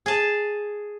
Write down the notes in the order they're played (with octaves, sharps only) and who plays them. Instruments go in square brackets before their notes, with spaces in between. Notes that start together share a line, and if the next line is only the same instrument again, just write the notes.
[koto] G#4 A5